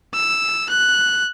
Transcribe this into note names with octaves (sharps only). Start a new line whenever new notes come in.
E6
F#6